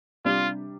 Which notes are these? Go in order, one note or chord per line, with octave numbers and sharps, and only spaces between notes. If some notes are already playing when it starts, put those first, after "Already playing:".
C3 G3 D4 F4 G4